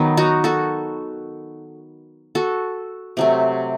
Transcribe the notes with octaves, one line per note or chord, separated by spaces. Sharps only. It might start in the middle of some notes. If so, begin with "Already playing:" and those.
Already playing: D#3 F#3 B3
D#4 F#4
F#4 A4
F#4 A4
C3 F#3 A3